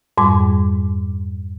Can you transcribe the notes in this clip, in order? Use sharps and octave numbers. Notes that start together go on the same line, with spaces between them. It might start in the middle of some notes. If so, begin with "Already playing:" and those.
F2 G#2 G3 D6